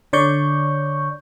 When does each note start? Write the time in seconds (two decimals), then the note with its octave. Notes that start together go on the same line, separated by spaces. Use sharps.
0.13 D3 C#5 D5 C#6 G6